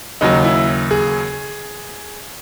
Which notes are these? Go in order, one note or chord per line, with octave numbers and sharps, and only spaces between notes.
D#2 C#3 F#3 D#4
E4
G#4